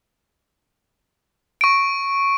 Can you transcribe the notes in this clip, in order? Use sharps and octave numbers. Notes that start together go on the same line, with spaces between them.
C#6 D7